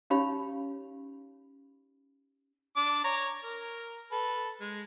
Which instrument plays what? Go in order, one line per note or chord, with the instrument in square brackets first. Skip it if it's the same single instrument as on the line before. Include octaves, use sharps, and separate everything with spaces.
[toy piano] C#4 D#4 G4 C#5 F5 B5
[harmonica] D4 D6
C#5 A#5
A#4
A4 B4
G#3